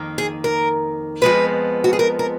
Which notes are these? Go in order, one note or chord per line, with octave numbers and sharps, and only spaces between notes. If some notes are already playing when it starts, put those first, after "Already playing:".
Already playing: F2 D#3 A#3
G#4
A#4
F2 F3 G#3 B3 B4
F#4
G#4
A#4
A#4